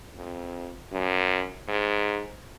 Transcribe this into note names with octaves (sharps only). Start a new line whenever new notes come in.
F2
F#2
G#2